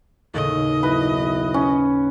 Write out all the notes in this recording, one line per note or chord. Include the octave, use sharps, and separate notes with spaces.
D#2 A2 C#3 D#5
B1 E4 B4
C#4